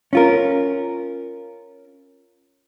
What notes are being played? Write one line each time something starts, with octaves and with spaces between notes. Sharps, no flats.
C#4 F4 A#4